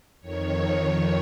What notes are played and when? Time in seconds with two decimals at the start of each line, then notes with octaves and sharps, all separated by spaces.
0.21 F2 D#3 C#5
0.68 C#5